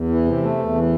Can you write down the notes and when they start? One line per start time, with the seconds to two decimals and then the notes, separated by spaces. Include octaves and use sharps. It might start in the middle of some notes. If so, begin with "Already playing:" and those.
Already playing: E2
0.08 E3
0.25 C3
0.42 A3
0.58 E2
0.75 E3